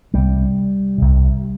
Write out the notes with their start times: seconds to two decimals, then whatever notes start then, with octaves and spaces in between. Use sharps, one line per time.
0.13 C2 C3 G3
0.98 C2 C3